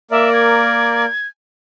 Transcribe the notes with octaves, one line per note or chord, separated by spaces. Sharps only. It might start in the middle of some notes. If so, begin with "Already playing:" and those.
A#3 A#4 D5 E5
G#6